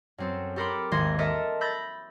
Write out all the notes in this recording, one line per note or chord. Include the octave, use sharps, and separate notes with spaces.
F#2 C4 A4
G4 A4 A#4 B5 C6 D6
G#1 D#2 D#3 C6 G#6 A#6
A4 A#4 D#5 E5 A5
B5 E6 G6 A6 A#6